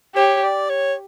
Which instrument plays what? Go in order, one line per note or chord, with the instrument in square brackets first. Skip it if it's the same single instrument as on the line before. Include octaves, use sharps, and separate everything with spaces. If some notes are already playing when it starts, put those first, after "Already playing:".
[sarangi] G4 [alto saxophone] C#5
[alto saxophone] D5
C#5